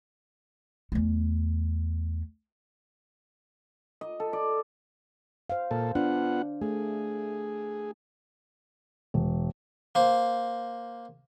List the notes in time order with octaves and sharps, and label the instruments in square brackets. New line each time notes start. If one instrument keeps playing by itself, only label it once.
[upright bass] E2 A3
[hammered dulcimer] D#5
A4
D5
[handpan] C5 F5
[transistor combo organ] A#2 A4
[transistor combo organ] B3 F4 F#5 [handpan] D4
[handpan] A3 [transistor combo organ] G#4
[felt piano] E1
[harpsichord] A#3 C5